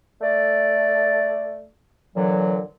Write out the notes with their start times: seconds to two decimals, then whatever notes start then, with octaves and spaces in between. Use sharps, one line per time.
0.22 A3 D5
2.15 A#2 D3 E3 F#3